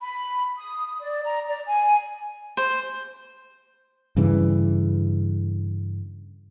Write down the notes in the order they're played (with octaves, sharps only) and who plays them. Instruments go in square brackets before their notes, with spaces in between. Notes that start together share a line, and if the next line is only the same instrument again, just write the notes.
[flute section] B5
D#6
D5
A#5
D5
G#5
[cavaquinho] C5
[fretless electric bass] G2 C#3 E3